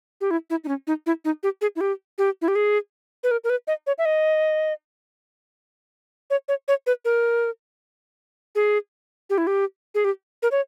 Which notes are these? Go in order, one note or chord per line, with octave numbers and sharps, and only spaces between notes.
G4
E4
E4
D#4
C#4
D#4
E4
D#4
G4
G#4
E4
G4
G4
E4
G4
G#4
B4
A#4
A#4
B4
D#5
C#5
E5
D#5
C#5
C#5
C#5
B4
A#4
G#4
G4
E4
G4
G#4
G4
A#4
C#5